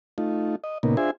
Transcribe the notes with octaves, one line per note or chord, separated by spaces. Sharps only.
A3 D#4 F4
D#5
A#2 C#3 A#3 B3 D#4
D4 F4 G#4 C5 E5 G#5